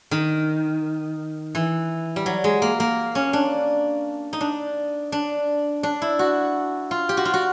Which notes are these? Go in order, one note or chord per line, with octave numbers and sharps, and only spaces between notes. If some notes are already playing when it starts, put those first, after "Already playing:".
D#3
E3
G3
F#3
G#3
A#3
A#3
C#4
D4
D#4
D4
D4
D4
E4
F#4
F4
G4
F#4
F4
F#4